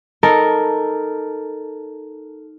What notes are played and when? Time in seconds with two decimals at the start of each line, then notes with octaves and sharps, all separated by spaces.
0.23 D#4 A4 A#4